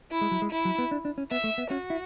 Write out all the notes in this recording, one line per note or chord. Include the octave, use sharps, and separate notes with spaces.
E4
G#3
F#3
G#3
E4
F#3
B3
D4
D4
C#4
B3 E5
A3
B3
C#4 F#4
E4